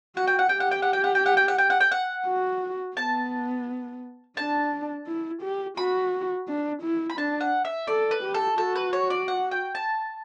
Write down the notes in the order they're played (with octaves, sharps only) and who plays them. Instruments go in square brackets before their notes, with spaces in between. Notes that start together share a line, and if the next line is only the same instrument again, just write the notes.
[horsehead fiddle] F#4 [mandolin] F#5
[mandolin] G5
F#5
[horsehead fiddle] G4 [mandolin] G5
[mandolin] F#5
G5
F#5
G5
F#5
G5
F#5
G5
F#5
G5
F#5
G5
F#5
[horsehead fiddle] F#4
[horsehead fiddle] B3 [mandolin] A5
[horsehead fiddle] D4 [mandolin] A5
[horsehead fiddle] E4
G4
[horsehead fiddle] F#4 [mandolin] B5
[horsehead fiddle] D4
E4
[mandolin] B5
[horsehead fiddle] D4 [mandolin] A5
[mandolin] F#5
E5
[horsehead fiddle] A4 [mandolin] D5
[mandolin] B4
[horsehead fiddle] G4
[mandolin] A4
[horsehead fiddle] F#4 [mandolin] A4
[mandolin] B4
C#5
D5
F#5
G5
A5